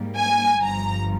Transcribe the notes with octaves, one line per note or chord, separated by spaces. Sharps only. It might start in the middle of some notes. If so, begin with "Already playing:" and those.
Already playing: G#2 G3 A#3
G#5
G1 G2 F3 A#5